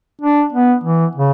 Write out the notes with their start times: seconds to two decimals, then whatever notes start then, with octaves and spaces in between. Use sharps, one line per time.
0.22 D4
0.53 B3
0.84 E3
1.16 C#3